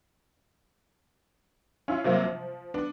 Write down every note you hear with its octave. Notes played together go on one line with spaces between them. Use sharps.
C#4 E4 F4
C3 F#3 A#3 C4
F3
B3 D4